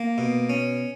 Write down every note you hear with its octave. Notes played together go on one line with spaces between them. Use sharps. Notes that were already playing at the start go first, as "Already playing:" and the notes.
Already playing: A#3
B2
C#4